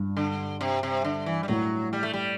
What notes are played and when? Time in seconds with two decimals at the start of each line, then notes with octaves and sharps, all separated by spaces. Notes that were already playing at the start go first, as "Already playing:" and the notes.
Already playing: G2
0.17 D3
0.61 C3
0.83 C3
1.05 D3
1.26 E3
1.43 G3
1.48 A2 F#3
1.93 G3
2.03 A3
2.13 G3